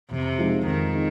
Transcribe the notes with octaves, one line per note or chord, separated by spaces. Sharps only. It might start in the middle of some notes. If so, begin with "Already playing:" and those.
F2 C3
F3 G#3 D#4 G#4
F2 D#3
D#4 G#4